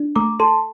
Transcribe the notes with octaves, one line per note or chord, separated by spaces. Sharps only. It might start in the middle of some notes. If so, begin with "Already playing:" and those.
Already playing: D4
A3 A#5 D6
A4 A5 C6